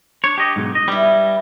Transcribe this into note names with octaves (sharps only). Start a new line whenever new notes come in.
D4 C#5
G4 D#5
B1 G#2
D#5
G3 E4 B4